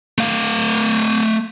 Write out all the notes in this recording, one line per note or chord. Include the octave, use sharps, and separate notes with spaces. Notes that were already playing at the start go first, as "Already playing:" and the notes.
A3 F5